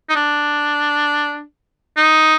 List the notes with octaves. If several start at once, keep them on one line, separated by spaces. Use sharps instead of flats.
D#4
D4
D#4